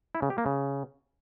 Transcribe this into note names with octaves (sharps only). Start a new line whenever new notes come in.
E4
C#3
G4
A#3
C#3